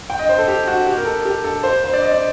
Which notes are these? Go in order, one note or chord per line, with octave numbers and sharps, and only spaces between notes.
G5
D#5
C5
A4
G4
F#4
G4
A#4
A4
G4
A4
C5
C5
D5
D#5
D5